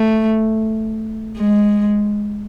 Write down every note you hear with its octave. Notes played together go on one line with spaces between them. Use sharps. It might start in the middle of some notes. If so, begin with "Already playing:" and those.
Already playing: A3
G#3